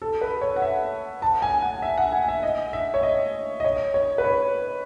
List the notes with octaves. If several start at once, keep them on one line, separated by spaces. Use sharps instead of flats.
A4
B4
C#5
F#5
E5
A5
G#5
F#5
E5
F#5
G#5
E5
D#5
E5
C#5
D#5
D#5
C#5
C#5
B4
C#5